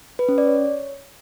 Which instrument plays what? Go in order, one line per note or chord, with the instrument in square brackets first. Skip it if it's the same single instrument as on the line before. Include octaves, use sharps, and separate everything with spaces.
[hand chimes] B4
C#4
D5
C#5